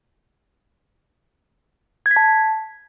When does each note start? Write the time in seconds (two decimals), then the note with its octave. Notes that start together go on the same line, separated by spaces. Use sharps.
2.06 G#6
2.11 B6
2.16 A5